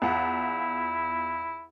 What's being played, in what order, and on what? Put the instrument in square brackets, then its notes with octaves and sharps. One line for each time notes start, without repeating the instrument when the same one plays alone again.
[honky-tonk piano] E2 F4 F#5 [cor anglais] E4